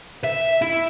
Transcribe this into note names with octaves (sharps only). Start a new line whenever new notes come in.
E5
E4